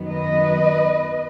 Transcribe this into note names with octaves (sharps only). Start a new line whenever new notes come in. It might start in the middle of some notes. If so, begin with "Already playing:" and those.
Already playing: F#2 D#3 F#3 B3
B4 D#5